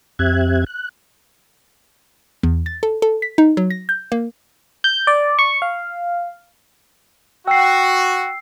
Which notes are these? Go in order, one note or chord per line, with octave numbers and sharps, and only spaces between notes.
F2 C4 G4 E5 F#6 G#6
F#6
E2
A6
A4
A4
B6
D#4
F#3
A#6
G6
A#3
G6
D5
C#6
F5
F#4 G5 E6 C7